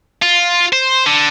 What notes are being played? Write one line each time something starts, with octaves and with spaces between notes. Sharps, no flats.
F4
C5
D3